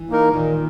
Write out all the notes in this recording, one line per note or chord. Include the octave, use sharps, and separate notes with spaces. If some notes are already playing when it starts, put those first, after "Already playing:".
Already playing: E3
A#3 D#4 A#4
A#2 D#3